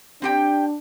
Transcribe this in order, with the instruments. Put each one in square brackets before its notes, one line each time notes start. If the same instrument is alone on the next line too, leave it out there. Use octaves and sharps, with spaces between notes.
[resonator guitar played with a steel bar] C4 G4 G5 [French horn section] D4